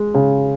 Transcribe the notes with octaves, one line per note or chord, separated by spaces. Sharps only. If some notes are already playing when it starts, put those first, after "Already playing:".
Already playing: G#3
C#3